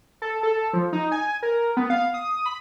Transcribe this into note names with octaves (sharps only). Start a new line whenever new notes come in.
A4
A4
F3
D#4
G#5
A#4
B3
F5
D#6
B5